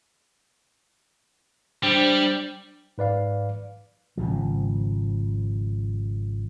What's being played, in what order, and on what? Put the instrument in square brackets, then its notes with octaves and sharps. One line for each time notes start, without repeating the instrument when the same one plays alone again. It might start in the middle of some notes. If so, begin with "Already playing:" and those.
[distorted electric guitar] G3 [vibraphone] D4 C5 G5
[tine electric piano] G#2 B4 D5 F5
[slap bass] G#1 D2 C#3 F3